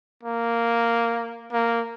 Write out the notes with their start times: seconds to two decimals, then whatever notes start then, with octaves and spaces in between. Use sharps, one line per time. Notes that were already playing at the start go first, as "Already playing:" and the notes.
0.24 A#3
1.52 A#3